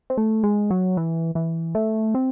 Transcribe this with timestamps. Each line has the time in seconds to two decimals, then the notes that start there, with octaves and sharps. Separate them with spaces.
0.10 C4
0.17 A3
0.44 G#3
0.70 F#3
0.97 E3
1.35 E3
1.75 A3
2.15 C4